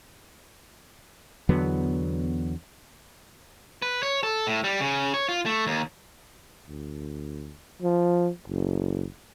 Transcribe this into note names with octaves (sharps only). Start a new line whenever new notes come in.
E2 D3 F#3 B3
B4
C#5
A4
A2
G3
C#3
C#5
F4
A3
D#2
D2
F3
F#1